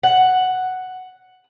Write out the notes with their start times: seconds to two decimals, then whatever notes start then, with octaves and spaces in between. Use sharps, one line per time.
0.03 F#5